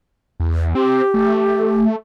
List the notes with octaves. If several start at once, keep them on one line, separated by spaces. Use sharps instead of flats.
E2
C4 G4
A3